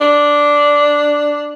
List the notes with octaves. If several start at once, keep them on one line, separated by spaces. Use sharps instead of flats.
D4